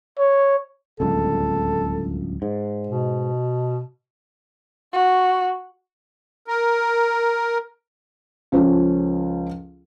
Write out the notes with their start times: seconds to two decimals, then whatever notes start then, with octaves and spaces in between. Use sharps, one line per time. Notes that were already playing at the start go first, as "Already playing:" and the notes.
0.19 C#5
1.00 D1 G1 C#2 A4
2.42 G#2
2.87 B2
4.93 F#4
6.48 A#4
8.52 C#2 F3 C#4 A4